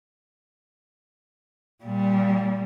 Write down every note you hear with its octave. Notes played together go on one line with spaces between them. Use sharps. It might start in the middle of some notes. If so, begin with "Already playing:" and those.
A#2 G3